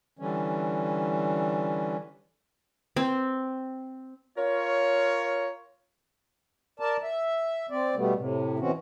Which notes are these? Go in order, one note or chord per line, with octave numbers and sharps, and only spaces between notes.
D3 E3 G3 C#4
C4
F4 A#4 C#5
A#4 D5 A5
E5
C4 D5
B2 G3 A3 B3
A2 C3
B2 E3 C4 C#4 F#4